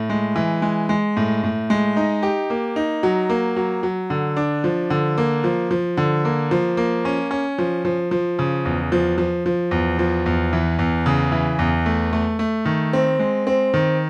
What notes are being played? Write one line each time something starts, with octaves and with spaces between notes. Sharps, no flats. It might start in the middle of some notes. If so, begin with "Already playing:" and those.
Already playing: A2
G#3
E3
G#3
G#3
A2
A2
G#3
D#4
G4
A#3
D#4
F#3
A#3
F#3
F#3
D3
D4
F3
D3
A#3
F3
F3
D3
A#3
F3
A#3
C#4
C#4
F3
F3
F3
C#3
E2
F3
F3
F3
E2
F3
E2
E3
E2
C#3
E3
E2
A3
A3
A3
D#3
C4
G#3
C4
D#3